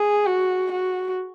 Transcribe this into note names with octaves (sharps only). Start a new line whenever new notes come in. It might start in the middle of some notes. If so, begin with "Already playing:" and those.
Already playing: G#4
F#4
F#4